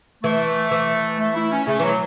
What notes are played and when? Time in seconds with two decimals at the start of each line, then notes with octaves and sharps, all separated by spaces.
0.24 E3 A3
0.71 E3
1.19 A3
1.35 E4
1.51 C#4
1.67 C#3 A3
1.80 E3 F#3